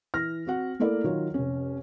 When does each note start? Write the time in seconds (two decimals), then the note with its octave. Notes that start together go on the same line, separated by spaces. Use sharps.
0.14 E3 F6 A#6
0.47 C4 F#4 F#5
0.80 A3 A#3 E4 A4 A#4 D5
1.04 D#3 F#3 F4 C#5
1.34 F1 C#4